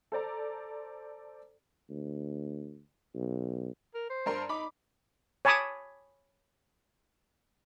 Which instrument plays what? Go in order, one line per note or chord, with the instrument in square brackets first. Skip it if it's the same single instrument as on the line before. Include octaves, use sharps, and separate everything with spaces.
[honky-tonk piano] A4 C5 D5 A#5
[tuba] D2
B1
[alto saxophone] A#4
C5
[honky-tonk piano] G2 A#4 C6
[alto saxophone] D#4 [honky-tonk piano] B5 D6
[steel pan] C#5 G#5 A5 B5 D6 D#6